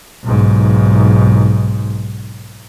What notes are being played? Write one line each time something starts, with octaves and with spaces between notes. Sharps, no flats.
B1 G#2